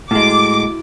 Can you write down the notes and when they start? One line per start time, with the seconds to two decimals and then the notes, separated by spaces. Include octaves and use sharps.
0.11 A2 G#3 E4 F#4 D6